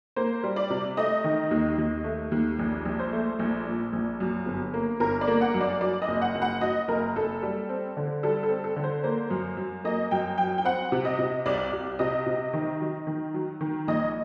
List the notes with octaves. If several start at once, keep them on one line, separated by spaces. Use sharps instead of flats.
A#3 C5
G3
D5
C3
A3 D#5
D#3
D#2
D#2
A3
D#2
A#1
A#1
C5
A3
A#1
A#2
A#1
F#2
G1
A#3
G1 A#4
D5
A#3
F#5
F#2
D5
F#3 D5
D#5
F#1
F#5
F#1
F#5
F#3 D#5
F#1 A#4
F#1 A4
G3
C4
D3
G3 A4
A4
C4
A4
D3
C5
A#3 C5
F#2
F#2
A#3 D#5
F#2 G5
F#3 G5
G5
C4 F#5
C3
D#5
C3
C2 D5
C2
C3 D#5
C3
D#3
F#3
D#3
F#3
D#3
A#1 D#5